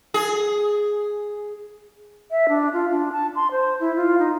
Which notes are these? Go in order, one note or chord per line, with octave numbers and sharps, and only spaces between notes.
G#4
E5
D4
F4
D4
A5
C6
C5
E4
F4
D#4